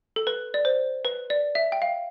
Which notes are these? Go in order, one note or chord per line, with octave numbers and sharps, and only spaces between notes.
A4
B4
D5
C5
B4
D5
E5
G5
F5